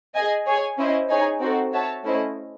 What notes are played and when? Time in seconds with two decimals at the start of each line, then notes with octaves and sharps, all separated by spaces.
0.15 G#4 D#5 G#5
0.46 G#4 C#5 G#5
0.78 C#4 E4 C5 D#5
1.10 D#4 G#4 C#5 G#5
1.41 C4 D#4 F#4 A4 C5
1.73 F#4 C#5 E5 A5
2.04 A3 C#4 E4 C5 D#5